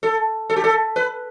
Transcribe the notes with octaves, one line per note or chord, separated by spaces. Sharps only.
A4
A4
G4
A4
B4